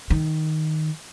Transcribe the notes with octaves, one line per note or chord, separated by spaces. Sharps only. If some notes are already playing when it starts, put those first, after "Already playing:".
D#3